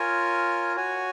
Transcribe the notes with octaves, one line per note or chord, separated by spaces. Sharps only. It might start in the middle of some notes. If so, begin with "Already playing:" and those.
Already playing: F4 A#4 C#5 G#5
F#4 C#5 G#5